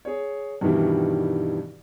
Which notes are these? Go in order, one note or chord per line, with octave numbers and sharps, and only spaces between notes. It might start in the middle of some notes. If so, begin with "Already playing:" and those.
G#4 C#5
G2 B2 D#3 E3 G3